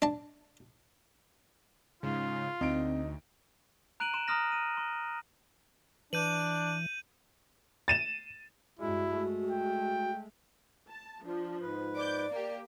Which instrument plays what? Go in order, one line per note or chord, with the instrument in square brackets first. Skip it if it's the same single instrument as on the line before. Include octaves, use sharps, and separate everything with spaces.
[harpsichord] D4 A5
[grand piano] G#2 [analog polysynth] C#3 [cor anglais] F4
[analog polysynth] D2 [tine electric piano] C4 [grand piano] D#4 D7
[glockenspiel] A#5 F#6 D7 D#7 F#7
C6 D7 E7
A#5 C6 D#6 F6 A#6
D#7
C6
[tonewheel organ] E3 [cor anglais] D4 [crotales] G6 D#7 F#7
[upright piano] A6 D#7 E7
[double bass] G2 G#3 [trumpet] E4 [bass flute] F#4
[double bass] G#3 A3
[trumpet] G5
[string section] A5
[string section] F3 [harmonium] D4
[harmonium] G#2 B4
[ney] D5 [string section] D6 G6
[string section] A#3 G4